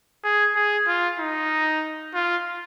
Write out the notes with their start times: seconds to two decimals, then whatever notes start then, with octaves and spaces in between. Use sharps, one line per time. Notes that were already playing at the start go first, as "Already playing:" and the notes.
0.24 G#4
0.55 G#4
0.88 F4
1.19 D#4
2.14 F4